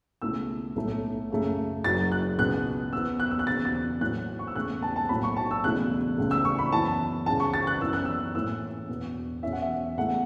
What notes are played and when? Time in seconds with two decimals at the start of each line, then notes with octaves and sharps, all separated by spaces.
0.22 C#2 B2 A3 E4 E6
0.76 B1 A2 A3
1.30 F#2 C#3 A3
1.84 F#1 F#2 F#3 A6
2.12 F#6
2.38 C#2 B2 B3 F#6
2.93 E2 E3 B3 E6
3.20 F#6
3.31 E6
3.39 F#6
3.47 E1 E2 C#3 A6
3.65 A6
4.01 A2 F#3 B3 E4 F#6
4.39 C#6
4.47 E6
4.55 E1 E2 C#3 A3 F#6
4.82 A5
4.96 A5
5.09 B1 A2 F#3 B5
5.23 C#6
5.36 A5
5.51 E6
5.64 E1 E2 C#3 A3 E4 F#6
6.18 C#2 C#3 A3
6.31 E6
6.45 C#6
6.59 B5
6.72 F#2 E3 B3 A5
7.26 C#2 C#3 E3 A5
7.40 C#6
7.54 A6
7.67 F#6
7.81 F#2 E3 B3 E6
7.93 F#6
8.05 E6
8.35 A2 E3 C#4 E6
8.89 E1 E2 B2 B3
9.43 E1 E2 E3 C#4 E4 E5
9.52 F#5
9.62 E5
9.97 E2 C#3 A3 E4 F#5